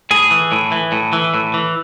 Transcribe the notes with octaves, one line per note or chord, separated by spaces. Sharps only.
A2 G#4
E3
A2
E3
A2
E3
A2
E3